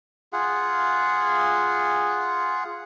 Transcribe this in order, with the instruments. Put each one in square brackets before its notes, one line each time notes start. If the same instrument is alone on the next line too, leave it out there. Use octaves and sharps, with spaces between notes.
[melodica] F4 G#4 F#5